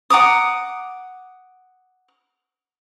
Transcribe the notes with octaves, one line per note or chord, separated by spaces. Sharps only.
F#5 A#5 D6 D#6